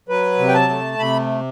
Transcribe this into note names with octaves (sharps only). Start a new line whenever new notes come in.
F#3 B4
C3
G5
A5
A3
C3 B5